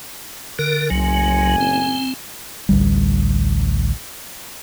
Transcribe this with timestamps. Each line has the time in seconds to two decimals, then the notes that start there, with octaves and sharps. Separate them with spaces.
0.59 D3 A#4
0.90 F#1 C2 A2 F#3 G#5
1.60 C4
2.69 A1 D2 G3